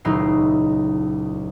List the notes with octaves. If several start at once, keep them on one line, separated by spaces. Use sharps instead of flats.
D#1 C#2 F#3 D#4 E4 C7